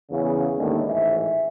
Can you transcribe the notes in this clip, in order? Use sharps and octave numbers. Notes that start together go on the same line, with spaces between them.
E2 C#3
D#2 A2 D3 G3 G#3
A1 G#2 E5